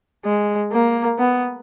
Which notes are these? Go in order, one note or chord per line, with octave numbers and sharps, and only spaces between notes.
G#3
A#3
B3